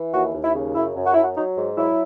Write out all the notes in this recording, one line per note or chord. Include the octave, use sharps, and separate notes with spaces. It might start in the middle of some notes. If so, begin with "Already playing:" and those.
Already playing: E3
D#2 F#4
D#2
E4
C#3
F#2 E4
F#2
F#4
F#2 E4
F#4
F#3 D#4
G#2
F#3 E4